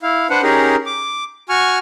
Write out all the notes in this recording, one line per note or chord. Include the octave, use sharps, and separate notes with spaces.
E4 F5
D4 B4 C5 F#5
C#4 D#4 G4 G#4 A#4
D6
F#4 G#5 C#6 F6